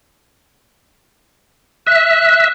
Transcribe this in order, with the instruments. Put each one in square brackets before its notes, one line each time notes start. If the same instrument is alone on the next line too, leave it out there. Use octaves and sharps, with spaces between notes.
[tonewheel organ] E5 [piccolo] F#6